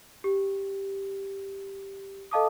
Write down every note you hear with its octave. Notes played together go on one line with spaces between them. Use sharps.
G4
A4 D#5 F5 A5 D6 D#6